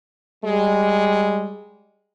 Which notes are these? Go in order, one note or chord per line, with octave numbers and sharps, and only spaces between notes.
G3 G#3